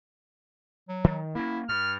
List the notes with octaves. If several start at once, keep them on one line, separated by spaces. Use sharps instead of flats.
F#3
D#3
A#3 C#4 E4
G2 F6